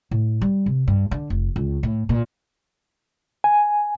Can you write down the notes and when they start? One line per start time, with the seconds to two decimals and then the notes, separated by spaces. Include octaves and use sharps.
0.11 A2
0.41 G3
0.66 C3
0.88 G2
1.11 D3
1.30 F1
1.56 C#2
1.83 A2
2.09 A#2
3.44 G#5